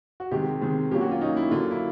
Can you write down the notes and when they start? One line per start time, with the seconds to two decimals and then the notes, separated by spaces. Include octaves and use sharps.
0.20 F#4
0.31 C3 D#3 G#3 G4
0.61 C3 D#3 G#3
0.91 A#2 F#3 A#3 C#4 G4
1.01 F#4
1.11 F4
1.21 A#2 F#3 A#3 C#4 D#4
1.37 E4
1.51 D3 F#3 A#3 F4
1.71 E4